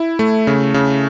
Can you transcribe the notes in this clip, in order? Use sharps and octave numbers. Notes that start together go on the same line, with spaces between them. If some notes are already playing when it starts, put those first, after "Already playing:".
Already playing: E4
A3
C#3
C#3